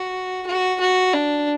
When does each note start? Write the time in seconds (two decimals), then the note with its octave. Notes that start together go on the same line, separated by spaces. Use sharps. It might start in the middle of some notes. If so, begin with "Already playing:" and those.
Already playing: F#4
0.47 F#4
0.80 F#4
1.13 D4